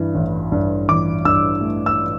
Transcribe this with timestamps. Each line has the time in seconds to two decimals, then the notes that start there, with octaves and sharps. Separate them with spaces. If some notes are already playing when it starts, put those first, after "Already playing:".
Already playing: G2 E3
0.15 A1
0.52 G2
0.89 A1 D6
1.25 G2 E6
1.61 A3
1.86 E6